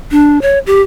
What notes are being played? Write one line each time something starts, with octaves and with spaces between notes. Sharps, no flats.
D4
C#5
G4